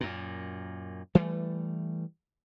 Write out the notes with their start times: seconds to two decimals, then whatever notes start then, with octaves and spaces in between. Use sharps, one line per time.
0.01 F#2 A#2
1.15 E3 G3 A3